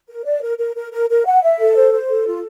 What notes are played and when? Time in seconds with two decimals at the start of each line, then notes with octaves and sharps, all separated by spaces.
0.09 A#4
0.25 D5
0.42 A#4
0.58 A#4
0.76 A#4
0.92 A#4
1.09 A#4
1.26 F#5
1.43 E5
1.59 A4
1.76 C5
1.93 C5
2.09 A4
2.26 F4